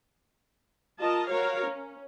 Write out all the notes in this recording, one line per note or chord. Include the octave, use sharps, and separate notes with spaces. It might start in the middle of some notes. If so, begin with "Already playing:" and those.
F4 A#4 D#5 A5
F#4 A#4 C#5 F5
C#4